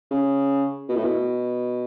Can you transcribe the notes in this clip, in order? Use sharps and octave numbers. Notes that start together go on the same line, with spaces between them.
C#3
B2
A2
B2